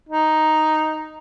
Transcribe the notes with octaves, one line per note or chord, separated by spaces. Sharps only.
D#4